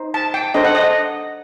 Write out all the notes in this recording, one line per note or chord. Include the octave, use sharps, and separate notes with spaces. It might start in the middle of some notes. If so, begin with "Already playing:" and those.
Already playing: D#4 C5
A5
G5
D4 A4 C5 D#5
F#5
D#5